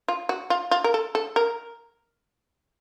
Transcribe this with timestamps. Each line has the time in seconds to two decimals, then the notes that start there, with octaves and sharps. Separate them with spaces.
0.08 F4
0.29 F#4
0.50 F4
0.71 F4
0.84 A#4
0.94 A4
1.15 A4
1.36 A#4